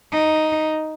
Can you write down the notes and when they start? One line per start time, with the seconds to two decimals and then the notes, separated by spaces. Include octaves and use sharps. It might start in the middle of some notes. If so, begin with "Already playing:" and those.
0.13 D#4